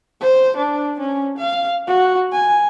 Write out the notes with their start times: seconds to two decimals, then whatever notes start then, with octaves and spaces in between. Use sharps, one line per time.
0.21 C5
0.57 D4
0.99 C#4
1.38 F5
1.88 F#4
2.32 G#5